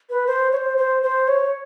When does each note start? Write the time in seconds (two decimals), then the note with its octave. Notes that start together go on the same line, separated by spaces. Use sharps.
0.10 B4
0.27 C5
0.52 C#5
0.57 C5
0.78 C5
1.03 C5
1.28 C#5